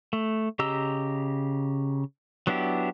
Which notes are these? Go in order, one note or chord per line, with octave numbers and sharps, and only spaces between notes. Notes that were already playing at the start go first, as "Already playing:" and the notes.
A3
C#3 G4 D#5 A#5 E6
F#3 B3 D4 E4 G4